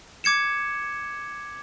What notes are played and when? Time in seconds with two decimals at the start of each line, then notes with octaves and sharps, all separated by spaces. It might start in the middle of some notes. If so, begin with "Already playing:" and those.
0.24 D6 G#6 C#7 E7